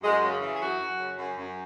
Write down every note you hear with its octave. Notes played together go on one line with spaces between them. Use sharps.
F#2 G#3
C#3
E3
G#4
F#2 F#4
F#2
C#3
F#2
F#2